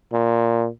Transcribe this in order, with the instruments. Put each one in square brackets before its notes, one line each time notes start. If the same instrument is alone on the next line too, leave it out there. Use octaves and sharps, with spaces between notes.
[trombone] A#2